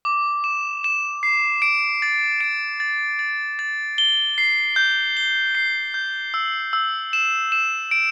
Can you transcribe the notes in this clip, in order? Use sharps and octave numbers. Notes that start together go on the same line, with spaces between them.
D6
E7
E7
C7
D7
A6
D7
A6
A6
A6
G7
C7
G6
G7
C7
G6
E6
E6
E7
E7
D7